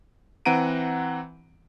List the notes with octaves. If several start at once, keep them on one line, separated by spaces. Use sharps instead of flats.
E3 C4 F#5 A#5 D7 D#7